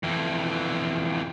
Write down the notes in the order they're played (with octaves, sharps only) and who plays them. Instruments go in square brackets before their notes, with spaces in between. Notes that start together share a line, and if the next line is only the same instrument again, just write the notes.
[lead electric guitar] F2 E3